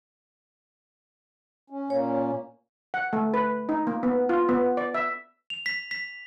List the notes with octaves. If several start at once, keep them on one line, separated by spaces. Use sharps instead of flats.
C#4
A#2 A#3 C#4 C#5
F#5
A3
B4
D#4
A#3
B3
F4
B3
D5
E5
F7
B6
B6